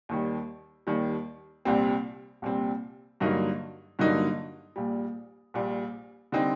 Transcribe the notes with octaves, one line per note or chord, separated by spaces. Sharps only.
D#2 D#3 G3
D#2 D#3 G3
C2 A#2 G3 C4
C2 A#2 G3 C4
G2 D3 F#3 A#3 D#4
G2 D3 F#3 A#3 D#4
A#1 A#2 G3
A#1 A#2 G3
D3 G3 C4 D#4